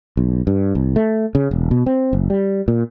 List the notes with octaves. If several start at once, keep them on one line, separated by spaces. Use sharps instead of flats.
B1
G2
C2
A3
C#3
E1
B2
C4
F#1
G3
A#2